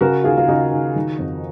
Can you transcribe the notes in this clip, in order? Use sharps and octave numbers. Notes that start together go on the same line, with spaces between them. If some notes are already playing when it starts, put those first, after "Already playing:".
C#3 F#4 A#4
D#2 F4 G#4
F4
C#3 D#4 F#4
D#2
D#3
F2